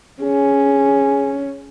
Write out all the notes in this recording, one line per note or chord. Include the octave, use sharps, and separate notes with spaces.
C#4 G#4